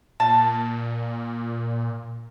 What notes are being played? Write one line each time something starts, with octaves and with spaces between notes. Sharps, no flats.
A#2 A5